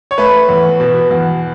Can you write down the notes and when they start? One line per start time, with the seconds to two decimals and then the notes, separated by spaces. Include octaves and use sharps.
0.11 C#5
0.18 A3 B4
0.49 E2
0.80 B2
1.11 E2